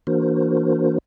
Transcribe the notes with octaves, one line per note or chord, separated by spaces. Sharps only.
E3 A#3 D4 F#4 A#4 C5